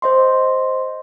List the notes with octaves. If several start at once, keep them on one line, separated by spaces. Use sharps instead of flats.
C5 D#5 C6